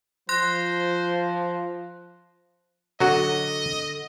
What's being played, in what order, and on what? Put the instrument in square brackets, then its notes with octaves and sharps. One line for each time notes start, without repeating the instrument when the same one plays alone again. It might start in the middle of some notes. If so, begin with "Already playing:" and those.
[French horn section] F3 [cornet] C5 [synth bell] C6 F#6 A#6
[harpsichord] D3 [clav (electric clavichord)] F#3 F#4 [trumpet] D#5